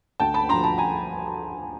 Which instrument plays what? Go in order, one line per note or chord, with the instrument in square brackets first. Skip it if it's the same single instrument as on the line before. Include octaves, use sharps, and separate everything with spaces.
[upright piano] D2 G5 A5
A5 B5
D3 F3 A#5 C6
A5 B5
G#5 A#5